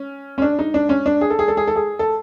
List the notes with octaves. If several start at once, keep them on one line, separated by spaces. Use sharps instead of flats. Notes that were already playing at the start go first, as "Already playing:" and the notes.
Already playing: C#4
C#4
D4
D#4
D4
C#4
D4
G#4
A4
G#4
A4
G#4
A4
G#4
A4